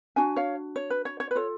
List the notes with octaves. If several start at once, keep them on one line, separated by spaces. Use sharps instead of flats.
D4 F#4 G#5
C#5 F5
C#5
B4
C#5
C#5
B4
F4 A4 C#5